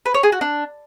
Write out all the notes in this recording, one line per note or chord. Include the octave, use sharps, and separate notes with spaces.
B4
C#5
G#4
F#4
D4